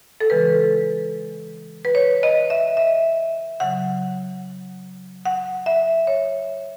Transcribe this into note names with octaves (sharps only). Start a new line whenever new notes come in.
A4
C#3 E3 G#3 B4
B4
C#5
D#5
E5
E5
C#3 F#3 F#5
F#5
E5
C#5